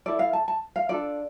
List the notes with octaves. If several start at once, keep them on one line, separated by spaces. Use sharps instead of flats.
E4 A4 D5
F5
A5
A5
F5
D4 F4 A4 D5